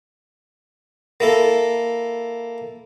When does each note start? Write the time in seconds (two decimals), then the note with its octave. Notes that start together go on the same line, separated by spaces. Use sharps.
1.20 A#3 E4 A4